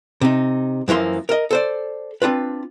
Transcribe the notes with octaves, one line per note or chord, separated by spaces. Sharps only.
C3 D#4
F#2 E3 F3 A#3 C6
A#4 D#5
A4 C5 D5
C4 D4 F4 B4